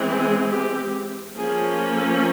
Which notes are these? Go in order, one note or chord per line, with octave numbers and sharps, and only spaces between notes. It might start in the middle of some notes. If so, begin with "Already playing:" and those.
Already playing: E3 G#3 C4
G#4
G4
F3 A#3 C#4 G#4
A4